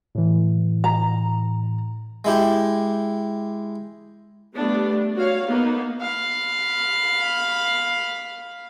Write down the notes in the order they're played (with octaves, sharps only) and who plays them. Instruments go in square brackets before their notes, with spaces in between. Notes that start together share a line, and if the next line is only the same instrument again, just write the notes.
[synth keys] A2 E3
[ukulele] A#5
[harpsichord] G#3 E4 G4
[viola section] G3 A3 B3 D4
F#4 C#5 F5
A#3 B3 D#4
[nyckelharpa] F5 B5